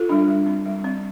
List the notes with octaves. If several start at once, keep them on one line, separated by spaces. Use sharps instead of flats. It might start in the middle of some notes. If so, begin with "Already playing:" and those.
Already playing: F4 A4
G3 D4
G3
C4
G3
C4